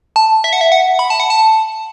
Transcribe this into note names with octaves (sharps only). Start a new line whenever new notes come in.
A5
E5
F#5
E5
F#5
B5
A5
F#5
A5